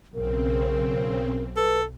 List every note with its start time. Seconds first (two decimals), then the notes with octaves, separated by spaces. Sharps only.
0.14 B1 C#3 C4 A#4
1.56 A4 B4